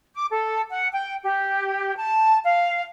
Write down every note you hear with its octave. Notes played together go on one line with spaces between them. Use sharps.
D6
A4
F#5
G5
G4
A5
F5